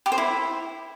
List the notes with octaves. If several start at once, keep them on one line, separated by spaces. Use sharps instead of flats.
G4
C5
E4